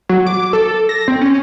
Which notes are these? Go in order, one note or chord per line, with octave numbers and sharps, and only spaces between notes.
F#3
D6
A4
A#6
C4
C#4